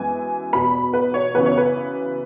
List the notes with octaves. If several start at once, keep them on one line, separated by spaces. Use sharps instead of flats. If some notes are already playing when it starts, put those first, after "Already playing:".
Already playing: F#2 E3 G#3 B3 G#5
E2 B2 B3 B5
B4
C#5
F#2 C#3 E3 B3 B4
C#5
B4